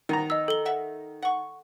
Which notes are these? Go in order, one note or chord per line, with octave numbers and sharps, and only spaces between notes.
D#3 B3 A#5
D#5 E6
A4 G7
E5 F#5
F#5 C#6